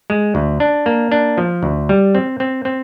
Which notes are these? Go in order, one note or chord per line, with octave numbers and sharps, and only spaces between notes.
G#3
D2
D4
A#3
D4
F3
D2
G3
C4
C4
C4